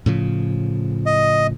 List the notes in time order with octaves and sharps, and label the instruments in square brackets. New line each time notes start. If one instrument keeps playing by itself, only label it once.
[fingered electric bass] A2 C#3 F3
[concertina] D#5